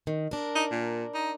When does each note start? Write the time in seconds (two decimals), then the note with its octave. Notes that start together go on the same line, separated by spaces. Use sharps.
0.07 D#3
0.31 D4 A#4
0.55 D#4
0.71 A#2
1.14 D#4